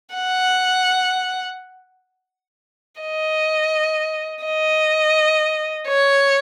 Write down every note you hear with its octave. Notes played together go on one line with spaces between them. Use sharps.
F#5
D#5
D#5
C#5